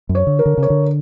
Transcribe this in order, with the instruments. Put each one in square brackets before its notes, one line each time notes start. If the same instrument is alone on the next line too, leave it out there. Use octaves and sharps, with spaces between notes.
[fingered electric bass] F#2
[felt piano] C#5
[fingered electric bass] D3
[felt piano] A#4
[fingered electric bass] D3
C#3
[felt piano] C#5
[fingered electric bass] D3